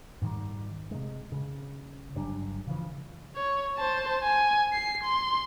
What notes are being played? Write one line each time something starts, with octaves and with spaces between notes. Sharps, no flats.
G#2 D#3 G3
C3 G#3
C#3
G1 F#3 G3 D4
C#3 E3 F3
C#5
C5 A5
G#5
C7
C6